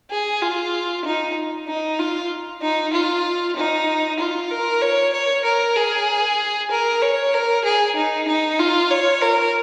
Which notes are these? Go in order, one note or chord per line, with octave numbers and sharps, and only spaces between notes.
G#4
F4
D#4
D#4
F4
D#4
F4
D#4
F4
A#4
C#5
C#5
A#4
G#4
A#4
C#5
A#4
G#4
D#4
D#4
F4
C#5
A#4